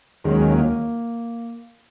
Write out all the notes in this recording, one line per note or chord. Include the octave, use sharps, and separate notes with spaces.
D#2 D#3 F#3 G#3 C#4
A#3